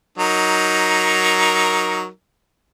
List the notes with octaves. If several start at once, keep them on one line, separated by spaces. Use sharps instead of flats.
F#3 D#4 A#4